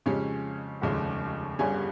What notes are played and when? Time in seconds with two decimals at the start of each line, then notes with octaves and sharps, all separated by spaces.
0.06 F2 C#3 G#3 C#4 G4
0.82 F1 D#2 C#3 G#3
1.59 G1 G2 G3 C#4 G#4